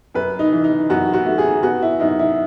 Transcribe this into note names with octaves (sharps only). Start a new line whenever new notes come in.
F#2 B4
D#4
E3
D#4
F#2 F#4
F#4
A3
G#4
B3 F#4
E4
F#2 D#4
E4